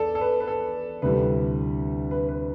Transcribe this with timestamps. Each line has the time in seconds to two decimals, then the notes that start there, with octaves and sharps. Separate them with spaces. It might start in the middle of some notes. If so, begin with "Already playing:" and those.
Already playing: E2 A4 D5
0.15 A4
0.21 B4
0.40 B4
0.47 A4
1.02 D2 C3 E3 G3 B4
2.11 B4
2.28 B4